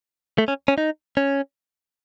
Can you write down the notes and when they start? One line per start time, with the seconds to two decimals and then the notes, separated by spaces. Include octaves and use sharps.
0.38 A3
0.48 C#4
0.68 C#4
0.78 D#4
1.17 C#4